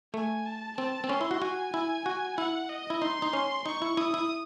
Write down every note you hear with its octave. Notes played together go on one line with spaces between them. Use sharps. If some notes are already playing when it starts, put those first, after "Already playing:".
A3 G#5
A5
C4 A5
C4
C#4 C6
E4
F#4
F#4 G#5
E4
F#4
E4 F#5
D#5
E4
D#4 C6
D#4
C#4
D#4 C#6
E4
E4 D#6
E4